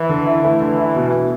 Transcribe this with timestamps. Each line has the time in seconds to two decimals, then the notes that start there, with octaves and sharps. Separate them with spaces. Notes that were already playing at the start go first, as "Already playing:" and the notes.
Already playing: E3
0.09 D3
0.26 E4
0.43 E3 A3
0.60 D3
0.78 E4
0.96 B2
1.13 B2